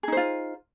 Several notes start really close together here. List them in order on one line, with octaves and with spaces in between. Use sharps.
G#4 D#4 C5 F4